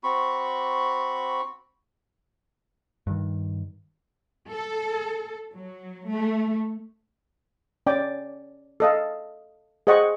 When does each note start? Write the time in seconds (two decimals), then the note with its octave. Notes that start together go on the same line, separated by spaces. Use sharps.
0.04 C4 F#4 B5 C#6
3.07 G2 D#3
4.49 A4
5.53 F#3
6.11 A3
7.87 C#4 D5 G5 D6
8.80 A4 D#5 F5
9.87 G#4 C5 D#5 F#5 G5 C#6